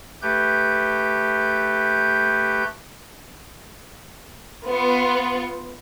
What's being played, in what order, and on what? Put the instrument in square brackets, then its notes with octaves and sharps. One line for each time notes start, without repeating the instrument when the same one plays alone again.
[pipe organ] A3 G4 B4 G6
[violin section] B3 F4